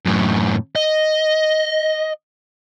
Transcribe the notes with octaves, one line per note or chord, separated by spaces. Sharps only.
F#2 A2
D#5